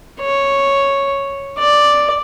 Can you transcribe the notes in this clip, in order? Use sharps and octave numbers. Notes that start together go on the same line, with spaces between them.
C#5
D5